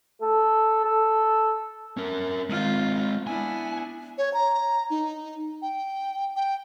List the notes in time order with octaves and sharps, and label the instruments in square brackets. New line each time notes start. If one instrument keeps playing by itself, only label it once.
[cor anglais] A4
A4
[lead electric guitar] C#4 A#4
[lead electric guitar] G#3 C4 [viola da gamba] F4
[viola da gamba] B3 D4 E4 [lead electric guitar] G#5
[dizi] C#5
A#5
D#4
G5
G5